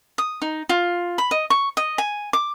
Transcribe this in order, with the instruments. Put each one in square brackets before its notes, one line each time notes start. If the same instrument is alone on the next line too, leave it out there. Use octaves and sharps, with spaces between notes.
[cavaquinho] D#6
D#4
F4
B5
D#5
C#6
D#5
G#5
D6